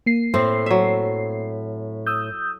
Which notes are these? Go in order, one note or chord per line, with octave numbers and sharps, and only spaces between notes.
A#3 C7
A2 C4
F#3 E5
D#6 E6 G6